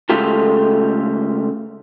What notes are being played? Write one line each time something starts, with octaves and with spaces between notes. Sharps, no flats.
C#3 G#3 A3 F4 G4 A4